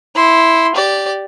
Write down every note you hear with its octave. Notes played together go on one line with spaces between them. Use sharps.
E4 C6
G4 D5